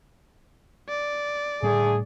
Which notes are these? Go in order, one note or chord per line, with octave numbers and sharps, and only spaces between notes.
D5
A2 D3 G3 A3 D4 G#4